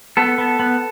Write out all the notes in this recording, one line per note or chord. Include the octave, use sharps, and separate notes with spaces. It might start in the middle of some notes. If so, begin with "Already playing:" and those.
B3 A4
B3
B3